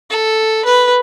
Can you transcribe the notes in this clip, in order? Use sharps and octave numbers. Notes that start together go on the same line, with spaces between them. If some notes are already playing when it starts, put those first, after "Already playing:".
A4
B4